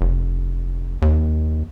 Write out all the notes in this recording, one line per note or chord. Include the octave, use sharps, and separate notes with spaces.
F1
D#2